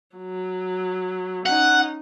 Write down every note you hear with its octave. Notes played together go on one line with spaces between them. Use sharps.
F#3
C#4 D#4 F#5